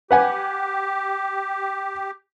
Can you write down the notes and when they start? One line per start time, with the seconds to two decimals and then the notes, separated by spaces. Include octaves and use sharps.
0.11 G4 B4 F#5 G#5